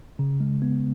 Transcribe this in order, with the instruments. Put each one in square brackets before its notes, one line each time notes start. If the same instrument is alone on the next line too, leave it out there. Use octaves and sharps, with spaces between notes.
[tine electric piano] C#3
G#3
B3